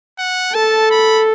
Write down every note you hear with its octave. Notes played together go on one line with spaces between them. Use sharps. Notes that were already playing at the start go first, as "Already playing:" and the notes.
F#5
A4 A5
B5